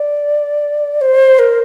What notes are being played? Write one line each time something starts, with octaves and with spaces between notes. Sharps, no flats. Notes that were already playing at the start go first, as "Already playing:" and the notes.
Already playing: D5
C5
A#4